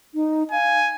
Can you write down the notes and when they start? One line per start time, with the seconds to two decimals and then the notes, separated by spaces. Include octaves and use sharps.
0.15 D#4
0.52 F5 G#5